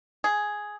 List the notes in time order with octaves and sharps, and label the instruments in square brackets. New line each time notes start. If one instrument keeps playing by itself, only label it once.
[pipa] G#4